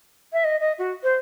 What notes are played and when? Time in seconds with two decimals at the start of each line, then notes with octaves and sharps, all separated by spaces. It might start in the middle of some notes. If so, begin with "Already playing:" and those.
0.33 E5
0.44 D#5
0.60 D#5
0.79 F#4
1.03 C5